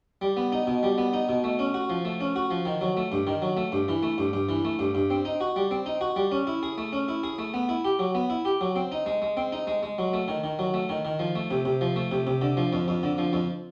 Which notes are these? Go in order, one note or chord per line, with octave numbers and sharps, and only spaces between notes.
G3
B3
D#4
B2
G3
B3
D#4
B2
A3
C#4
F#4
F3
A3
C#4
F#4
F3
D#3
F#3
A3
G2
D#3
F#3
A3
G2
E3
A3
G2
G2
E3
A3
G2
G2
C4
D#4
F#4
G3
C4
D#4
F#4
G3
C#4
E4
G#4
A3
C#4
E4
G#4
A3
B3
E4
G4
F#3
B3
E4
G4
F#3
C4
D#4
G#3
G#3
C4
D#4
G#3
G#3
F#3
A3
D#3
D#3
F#3
A3
D#3
D#3
F3
A3
C3
C3
F3
A3
C3
C3
D3
F3
F2
F2
D3
F3
F2